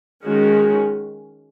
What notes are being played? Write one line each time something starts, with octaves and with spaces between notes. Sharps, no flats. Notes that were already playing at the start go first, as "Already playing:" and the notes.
D#3 G#3 C#4 F#4